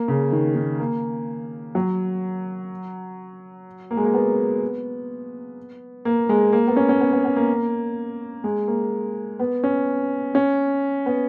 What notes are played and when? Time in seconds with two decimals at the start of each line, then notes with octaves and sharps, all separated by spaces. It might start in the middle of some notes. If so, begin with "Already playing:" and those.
Already playing: A#3
0.08 C#3
0.32 D#3
0.55 D#3
0.79 A#3
1.75 F#3
3.91 A#3
3.97 G#3
4.04 A#3
4.14 B3
6.05 A#3
6.29 G#3
6.53 A#3
6.67 B3
6.76 C#4
6.89 C#4
7.01 B3
7.13 B3
7.24 B3
7.36 A#3
8.44 G#3
8.68 A#3
9.39 B3
9.64 C#4
10.35 C#4
11.06 B3